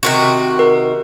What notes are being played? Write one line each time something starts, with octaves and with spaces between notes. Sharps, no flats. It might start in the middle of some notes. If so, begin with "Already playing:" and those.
C3 D#3 F#4
A#4